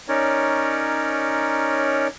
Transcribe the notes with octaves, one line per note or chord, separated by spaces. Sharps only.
C#4 D#4 A#4 C#5 D5